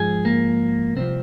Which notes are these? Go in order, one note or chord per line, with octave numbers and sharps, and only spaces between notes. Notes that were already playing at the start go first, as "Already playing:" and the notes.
Already playing: G#2 F3 G#4
A#3
C2 C3 F3 C4